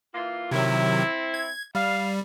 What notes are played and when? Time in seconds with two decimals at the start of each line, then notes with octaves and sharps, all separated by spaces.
0.14 E3 A#3 F4
0.51 C3 D#3 F#3 C4 E4
1.34 G#6
1.75 G3 F5